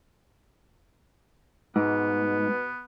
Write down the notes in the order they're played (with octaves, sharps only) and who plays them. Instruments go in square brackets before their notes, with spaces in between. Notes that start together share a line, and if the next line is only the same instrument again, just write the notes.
[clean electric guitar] G#2 [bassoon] B2 [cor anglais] B3